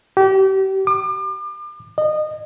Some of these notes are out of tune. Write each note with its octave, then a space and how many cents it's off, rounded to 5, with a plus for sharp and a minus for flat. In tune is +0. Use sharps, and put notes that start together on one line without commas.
G4 -35
D6 +40
D#5 -25